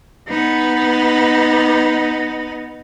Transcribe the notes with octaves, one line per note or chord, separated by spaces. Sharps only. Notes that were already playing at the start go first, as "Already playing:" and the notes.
B3 D#4